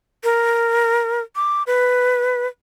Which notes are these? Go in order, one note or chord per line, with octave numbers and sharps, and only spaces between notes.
A#4
D6
B4